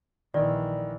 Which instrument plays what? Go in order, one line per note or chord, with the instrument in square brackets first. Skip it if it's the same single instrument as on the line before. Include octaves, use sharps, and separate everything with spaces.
[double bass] A#1 E3 [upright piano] D#3 [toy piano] D5